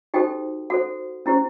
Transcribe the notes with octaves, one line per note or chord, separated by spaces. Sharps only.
D#4 F#4 G4 A4 C5 G5
F#4 A4 C5 F#5
C#4 E4 G4 C5